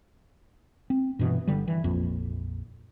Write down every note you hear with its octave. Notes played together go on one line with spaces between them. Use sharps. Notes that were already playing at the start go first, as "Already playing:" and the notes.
C4
G2 B2 E3
G1 D3 G3
E3
A#1 F2